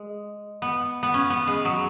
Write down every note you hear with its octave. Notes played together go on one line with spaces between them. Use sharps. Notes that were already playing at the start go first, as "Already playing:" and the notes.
Already playing: G#3
B3
B3
C#4
B3
G#3
F#3